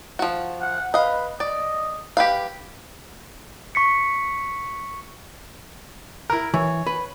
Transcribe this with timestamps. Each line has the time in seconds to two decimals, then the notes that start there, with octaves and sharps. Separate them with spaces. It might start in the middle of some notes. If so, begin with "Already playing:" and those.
0.19 F3 F#4
0.61 F#5
0.94 B4 D#5 F5
1.40 D5 D#5
2.17 G4 B4 F5
3.75 C#6 B6 C#7
6.30 E4 A#4
6.54 E3 C#5
6.87 B4